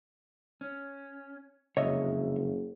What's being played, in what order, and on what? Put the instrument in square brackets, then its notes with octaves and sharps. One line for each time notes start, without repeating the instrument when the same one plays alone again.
[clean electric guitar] C#4
[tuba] F#1 [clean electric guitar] C2 F2 C#3 [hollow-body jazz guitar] C#5 D#5 E5